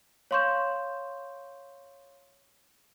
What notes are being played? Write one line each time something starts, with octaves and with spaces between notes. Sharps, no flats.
C#5 F5 C6 C#6 G6 E7